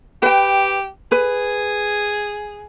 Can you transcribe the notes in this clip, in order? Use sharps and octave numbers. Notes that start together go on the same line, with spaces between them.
G4 B4 G5
G#4 B4